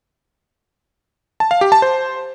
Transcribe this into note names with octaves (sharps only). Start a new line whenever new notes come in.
A5
F5
G4
A5
C5